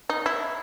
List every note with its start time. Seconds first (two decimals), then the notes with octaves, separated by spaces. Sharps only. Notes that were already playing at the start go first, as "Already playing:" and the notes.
0.09 D#4
0.26 E4